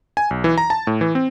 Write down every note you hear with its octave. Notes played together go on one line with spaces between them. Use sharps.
G#5
B1
E3
A#5
A5
A2
E3
C4